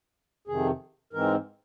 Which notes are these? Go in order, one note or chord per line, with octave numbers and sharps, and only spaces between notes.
F2 C3 D#3 G#4
G#2 E3 G#3 C4 A#4